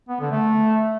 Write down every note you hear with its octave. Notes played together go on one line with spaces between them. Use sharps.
B3
D3
A3